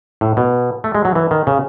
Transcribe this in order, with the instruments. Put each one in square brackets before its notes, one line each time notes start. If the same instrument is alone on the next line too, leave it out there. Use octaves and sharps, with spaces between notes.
[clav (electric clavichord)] A2
B2
A3
G#3
F#3
E3
D#3
C#3